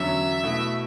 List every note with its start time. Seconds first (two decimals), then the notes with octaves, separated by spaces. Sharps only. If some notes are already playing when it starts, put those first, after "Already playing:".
Already playing: E2 D3 F#3 C#4 E5
0.43 B2 A3 E4